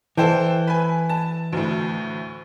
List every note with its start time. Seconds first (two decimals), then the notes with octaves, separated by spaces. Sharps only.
0.17 E3 A4 C5 G5
0.67 B4 G#5
1.09 A5
1.52 D2 A2